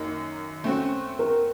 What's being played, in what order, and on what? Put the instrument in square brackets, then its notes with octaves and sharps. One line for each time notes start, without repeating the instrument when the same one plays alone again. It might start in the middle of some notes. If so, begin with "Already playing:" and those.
Already playing: [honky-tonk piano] F#2 D#3 A#3 [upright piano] D#4
[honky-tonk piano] A3 C4 F#4 [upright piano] C#4
[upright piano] A#4